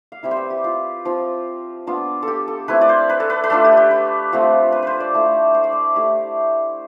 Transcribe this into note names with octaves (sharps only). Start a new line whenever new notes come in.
F5
G3 C4 E4 E5
C5
B4
G4
F4
F3 C4 F4
B3 D4 F4
A4
G4
A4
A3 C4 E4 B4
D5
C5
B4
A4
B4
B4
A3 D4 F4 A4
G4
G4
B4
F3 A3 C4 F4
B4
B4 C5
D5
A3 E4
C5
D5
C5
A3 E4 G4